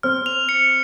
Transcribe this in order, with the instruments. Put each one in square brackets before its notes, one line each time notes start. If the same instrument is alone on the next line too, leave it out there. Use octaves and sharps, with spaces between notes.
[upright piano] C4 [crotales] F6
[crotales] F7
C#7